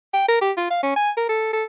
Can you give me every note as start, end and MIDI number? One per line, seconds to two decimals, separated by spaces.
0.14 0.26 79
0.28 0.37 70
0.41 0.52 67
0.57 0.70 65
0.70 0.79 77
0.83 0.93 61
0.96 1.10 80
1.17 1.25 70
1.29 1.51 69
1.53 1.64 69